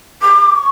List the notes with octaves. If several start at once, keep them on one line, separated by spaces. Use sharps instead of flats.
D6
D6
C#6